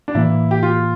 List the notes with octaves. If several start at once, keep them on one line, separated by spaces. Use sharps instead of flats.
D4
A2 E3 A#3 E4
G4
F4